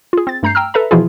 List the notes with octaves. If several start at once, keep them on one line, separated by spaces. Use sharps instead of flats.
F4 G#4
C4 A6
G2 A3 A#5 G6 C7
G5 A#5 E6 F6
A4 B4 E5 A#5
B2 E3 F3 E4 F4 G#4